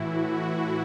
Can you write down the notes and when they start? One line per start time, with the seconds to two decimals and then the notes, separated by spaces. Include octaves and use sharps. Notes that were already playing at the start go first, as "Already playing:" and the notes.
Already playing: A2 E3 E4 F#4
0.39 E4